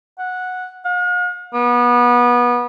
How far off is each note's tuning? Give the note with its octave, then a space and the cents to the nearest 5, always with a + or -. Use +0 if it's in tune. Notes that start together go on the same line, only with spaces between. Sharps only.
F#5 -10
F5 +45
B3 -25